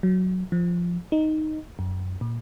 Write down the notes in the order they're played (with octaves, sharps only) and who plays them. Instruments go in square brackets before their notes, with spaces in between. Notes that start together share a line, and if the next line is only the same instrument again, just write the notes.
[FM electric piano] F#3
F3
D#4
F#2
A#2